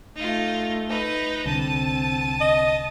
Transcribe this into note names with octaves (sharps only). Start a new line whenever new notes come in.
A3 D#4 F4
D#4 B4
C2 D3 C4 A5 D#7
D#5